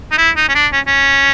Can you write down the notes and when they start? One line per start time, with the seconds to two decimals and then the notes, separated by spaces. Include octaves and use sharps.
0.11 D#4
0.18 E4
0.37 D#4
0.49 C#4
0.55 D4
0.73 C#4
0.87 C#4